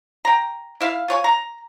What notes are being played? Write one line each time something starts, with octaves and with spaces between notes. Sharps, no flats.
G5 A#5
E4 E5 F5
F4 C#5 G#5
A#5